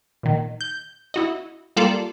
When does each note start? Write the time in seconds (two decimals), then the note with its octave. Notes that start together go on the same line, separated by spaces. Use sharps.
0.23 A#2 D#3
0.61 G6
1.14 E4 F#4 D#5
1.76 G3 A#3 F4 A4 D5